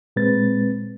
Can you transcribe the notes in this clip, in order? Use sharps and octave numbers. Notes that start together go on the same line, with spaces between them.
A#2 G#3 C4 B4 A6